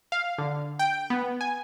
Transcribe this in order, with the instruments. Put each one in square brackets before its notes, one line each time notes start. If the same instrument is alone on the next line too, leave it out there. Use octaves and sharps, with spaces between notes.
[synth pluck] F5
D3
G5
B3
G#5